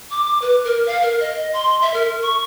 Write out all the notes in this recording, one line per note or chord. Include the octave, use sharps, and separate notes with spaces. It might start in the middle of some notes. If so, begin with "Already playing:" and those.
D6
B4
A#4
F5
A#4
D#5
C6
E5
A#4
C#6